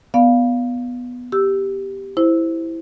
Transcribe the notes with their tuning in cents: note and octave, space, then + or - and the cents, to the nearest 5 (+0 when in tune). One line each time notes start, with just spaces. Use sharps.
B3 +0 D5 -5 F5 +0
G4 +0 E6 +0
E4 +0 C5 +0